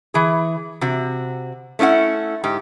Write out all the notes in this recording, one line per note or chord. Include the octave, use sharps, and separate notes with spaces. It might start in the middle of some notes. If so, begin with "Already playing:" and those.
E3 G#4
C3 F#4
A3 C#4 E4 D5 F#5
G#2 G4